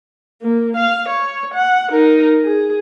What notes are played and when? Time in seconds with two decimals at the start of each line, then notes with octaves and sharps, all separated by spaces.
0.42 A#3
0.77 F5
1.09 C#5
1.54 F#5
1.90 D#4 A#4
2.45 G#4